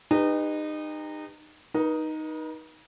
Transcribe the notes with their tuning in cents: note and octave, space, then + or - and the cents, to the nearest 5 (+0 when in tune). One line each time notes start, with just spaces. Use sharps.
D#4 -25 G4 +40 B4 +0
D#4 +0 B4 -45